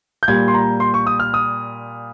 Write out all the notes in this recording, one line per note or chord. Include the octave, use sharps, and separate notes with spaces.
G6
A#2 G3 G#6
C6
A#5
C6
C#6
D#6
F6
D#6